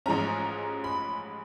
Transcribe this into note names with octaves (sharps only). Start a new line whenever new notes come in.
A1 G#2 F3 G#3 C#4 A#5
B5